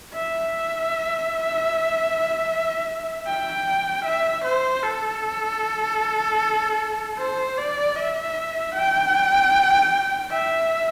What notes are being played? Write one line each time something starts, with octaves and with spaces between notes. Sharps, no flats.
E5
G5
E5
C5
A4
C5
D5
E5
G5
E5